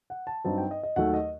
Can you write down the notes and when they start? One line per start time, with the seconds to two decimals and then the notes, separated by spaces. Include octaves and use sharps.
0.10 F#5
0.27 A5
0.45 G2 F#3 C4 D#4 A5
0.58 G5
0.71 D#5
0.83 D#5
0.96 D#2 D#3 F#3 A3 F#5
1.14 D#5